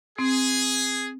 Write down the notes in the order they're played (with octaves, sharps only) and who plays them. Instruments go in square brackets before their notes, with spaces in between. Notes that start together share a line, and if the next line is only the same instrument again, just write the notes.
[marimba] C4 [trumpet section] G#4